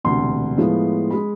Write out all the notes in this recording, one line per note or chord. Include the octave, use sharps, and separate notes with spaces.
E1 D2 C3 C6
A2 F3 G#3 B3 F4
G#3 B5